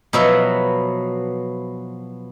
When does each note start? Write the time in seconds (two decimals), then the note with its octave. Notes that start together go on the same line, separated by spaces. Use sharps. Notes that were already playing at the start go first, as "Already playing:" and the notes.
0.13 B2 F3 F#3 B3 E5